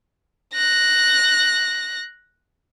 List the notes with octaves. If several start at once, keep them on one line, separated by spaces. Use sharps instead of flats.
F#6 A#6